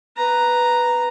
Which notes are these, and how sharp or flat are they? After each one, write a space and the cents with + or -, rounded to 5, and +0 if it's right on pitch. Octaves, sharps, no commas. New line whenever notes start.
B4 +0 A#5 +0